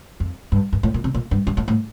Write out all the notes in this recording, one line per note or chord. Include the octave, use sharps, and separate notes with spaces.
F2
G2
G2
A2
A#2
C3
A#2
G2
G2
A2
A2